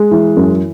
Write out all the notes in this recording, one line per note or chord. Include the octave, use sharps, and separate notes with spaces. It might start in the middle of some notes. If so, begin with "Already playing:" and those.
Already playing: G#3
E3
F#2